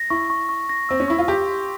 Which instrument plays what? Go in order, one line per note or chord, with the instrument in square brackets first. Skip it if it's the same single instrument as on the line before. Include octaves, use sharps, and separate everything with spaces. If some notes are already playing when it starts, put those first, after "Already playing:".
Already playing: [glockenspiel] A#6
[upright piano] E4 [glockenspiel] C#6
[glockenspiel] C#6
C#6
A#6
[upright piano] C4 [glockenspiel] E6
[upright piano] C#4
[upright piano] E4 [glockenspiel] C#6
[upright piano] F4
[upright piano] G4 [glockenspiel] C6
[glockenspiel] C6